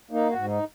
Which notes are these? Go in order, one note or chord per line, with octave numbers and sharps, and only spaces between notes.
A#3 D#4
F#4
G#2
D#4